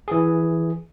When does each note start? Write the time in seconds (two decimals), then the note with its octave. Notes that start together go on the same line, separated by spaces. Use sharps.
0.08 E3 G#4